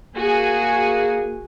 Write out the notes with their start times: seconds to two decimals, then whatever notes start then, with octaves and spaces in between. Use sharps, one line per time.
0.17 A#3 F#4 G#4 G#5